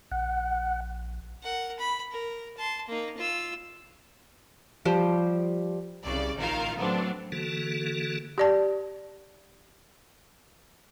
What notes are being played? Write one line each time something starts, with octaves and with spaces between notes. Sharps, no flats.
A#1 F#5
A#4 F#5
B5
A#4
A5 C6
A#3 D#4
F4 E6
F3 G3 G4 C5
C2 C#3 D5
A1 D#3 F4 A#4 F5
F#3 A3 B3 C4 D4
D3 E3 A#3 F#4 A4
G4 D5 A5